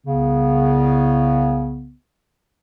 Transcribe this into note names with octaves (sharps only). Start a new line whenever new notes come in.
C2 C#3 B3